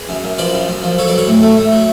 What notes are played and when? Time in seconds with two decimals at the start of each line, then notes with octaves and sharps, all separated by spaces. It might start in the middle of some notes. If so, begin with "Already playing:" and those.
Already playing: G#4 B4
0.09 F#2
0.24 F#2
0.38 F3 B4 D5
0.54 F#2
0.69 F#2
0.83 F3
0.98 F#3 A4 C#5
1.07 B4 D5
1.13 F#3 A4 C#5
1.28 A2
1.43 A3
1.57 A3
1.72 F#3